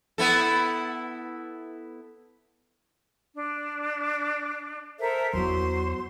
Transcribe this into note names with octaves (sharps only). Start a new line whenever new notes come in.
B3 E4 A4
D4
A4 A#4 C5 E5
E2 F#3 B3 C5 C6